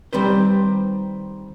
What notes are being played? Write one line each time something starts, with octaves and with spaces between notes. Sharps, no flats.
D#3 G3 C4 B4 C5